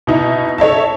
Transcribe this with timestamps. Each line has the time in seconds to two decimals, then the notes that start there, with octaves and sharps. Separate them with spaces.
0.07 B2 D#4 E4
0.58 A4 C#5 E5 A5